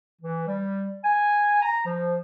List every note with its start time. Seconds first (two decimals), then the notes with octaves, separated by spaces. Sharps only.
0.21 E3
0.47 G3
1.03 G#5
1.62 A#5
1.85 F3